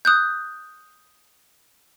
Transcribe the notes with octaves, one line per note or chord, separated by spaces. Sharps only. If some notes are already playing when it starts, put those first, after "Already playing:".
D#6 F#6 G6